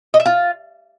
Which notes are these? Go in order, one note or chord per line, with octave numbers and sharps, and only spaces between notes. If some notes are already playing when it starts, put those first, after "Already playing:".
D#5
E5
F4